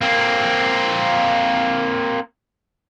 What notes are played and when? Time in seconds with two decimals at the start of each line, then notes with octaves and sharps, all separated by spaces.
0.01 A#3 C4